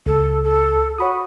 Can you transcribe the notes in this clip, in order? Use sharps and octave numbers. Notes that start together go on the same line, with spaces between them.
C#2 A4
A4
F#4 C#5 B5 D#6